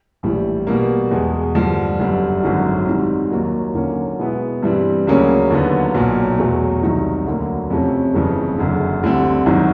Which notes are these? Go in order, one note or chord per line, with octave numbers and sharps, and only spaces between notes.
A#1 A2 E3 G3
B2 G3 A#3
E2 B2 G#3
G2 D3 F3
G1 F#2 D3 G3
G#1 F#2 D3 F#3
G#2 D#3 G3 C4
D#2 D#3 F#3 A#3
D#2 D3 F#3 A#3 C#4
B2 G#3 B3 E4
G2 E3 G3 C4
D2 C#3 F#3 A#3 C#4
D#2 D3 F#3 B3
B1 A#2 F#3
E2 B2 F#3 A3
C2 C3 D#3 F#3
D2 D3 F#3 A#3
F2 C3 F3 A3 C#4
G1 F2 C#3 E3 A3
F#1 F#2 D3
D2 D3 G3 C4
G#1 F#2 D#3